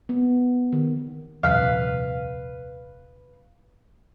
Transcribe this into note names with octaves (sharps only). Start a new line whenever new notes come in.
B3
D#3
D#1 C2 F2 B4 F5